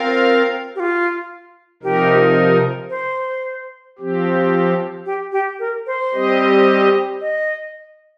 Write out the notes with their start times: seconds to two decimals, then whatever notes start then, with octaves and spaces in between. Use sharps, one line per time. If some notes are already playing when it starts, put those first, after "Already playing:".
Already playing: C4 F4 A#4 F5
0.75 G4
0.80 F4
1.83 C3 F3 D#4 G4 A#4
2.90 C5
3.99 F3 C4 G4
5.06 G4
5.32 G4
5.60 A#4
5.87 C5
6.14 G3 C4 G4 D#5
7.21 D#5